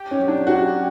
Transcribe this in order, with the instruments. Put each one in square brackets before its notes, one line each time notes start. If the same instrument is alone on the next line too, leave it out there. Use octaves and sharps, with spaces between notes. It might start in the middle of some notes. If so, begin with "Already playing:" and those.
Already playing: [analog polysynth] G4
[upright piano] C#4
[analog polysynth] F#3
[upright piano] D4
[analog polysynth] F#3 [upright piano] F#4
[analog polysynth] C#4